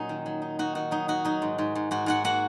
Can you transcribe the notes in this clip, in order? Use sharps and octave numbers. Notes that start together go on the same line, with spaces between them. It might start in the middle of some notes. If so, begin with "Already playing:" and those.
Already playing: A#2 F#3 C#4 D#4
D#3
F#3
D#4
D#4 F#4
D#3 F#4
F#3 D#4
D#4 F#4
F#3 D#4
G#2
G#2
G#2
G#2 F#4
G#2 F#4 F#5
A#3 F#4 F#5